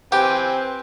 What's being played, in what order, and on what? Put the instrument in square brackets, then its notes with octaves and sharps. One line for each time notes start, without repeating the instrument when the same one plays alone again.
[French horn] C4 [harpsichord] G4 [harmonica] B4 G#5 [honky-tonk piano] G5